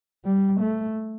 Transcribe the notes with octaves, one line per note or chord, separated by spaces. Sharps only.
G3
A3